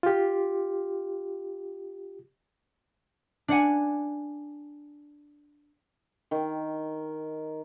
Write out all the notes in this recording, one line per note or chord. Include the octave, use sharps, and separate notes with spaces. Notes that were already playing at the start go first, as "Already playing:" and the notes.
F4 G4
D4 D5 F#5 G#5
D#3